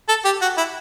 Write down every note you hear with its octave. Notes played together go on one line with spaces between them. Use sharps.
A4
G4
F#4
E4